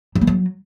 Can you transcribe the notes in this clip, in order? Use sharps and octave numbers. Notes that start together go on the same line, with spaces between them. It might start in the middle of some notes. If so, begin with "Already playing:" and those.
F#3
A#3
F#3